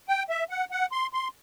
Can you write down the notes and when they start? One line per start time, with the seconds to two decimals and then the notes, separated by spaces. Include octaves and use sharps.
0.09 G5
0.30 E5
0.50 F#5
0.71 F#5
0.92 C6
1.13 C6